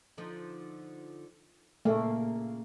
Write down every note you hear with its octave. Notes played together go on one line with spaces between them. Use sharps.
D3 F3 D#4
A#2 C#3 A3 A#3